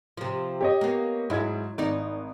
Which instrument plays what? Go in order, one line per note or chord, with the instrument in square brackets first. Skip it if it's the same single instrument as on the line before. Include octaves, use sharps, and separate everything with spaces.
[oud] C3 F3
[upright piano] G4 C#5 D#5
[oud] A#3 B3
[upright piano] G#2 G#3 G#6 [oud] F#3 E4
[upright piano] G#1 [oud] D#4 D5